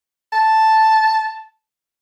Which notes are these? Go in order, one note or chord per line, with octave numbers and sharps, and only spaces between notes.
A5